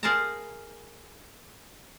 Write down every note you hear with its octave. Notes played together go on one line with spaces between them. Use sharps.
G#4 A#4 C5 F5 A5 A#5